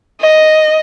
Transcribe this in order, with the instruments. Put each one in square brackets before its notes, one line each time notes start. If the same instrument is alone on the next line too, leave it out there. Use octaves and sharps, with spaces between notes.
[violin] D#5